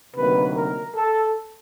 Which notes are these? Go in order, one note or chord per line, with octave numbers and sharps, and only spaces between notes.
D2 C3 D#3 F#3 A#3 B4
A#4
A4